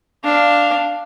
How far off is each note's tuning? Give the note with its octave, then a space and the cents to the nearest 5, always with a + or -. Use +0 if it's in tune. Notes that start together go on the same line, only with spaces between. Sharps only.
D4 +0 F5 +0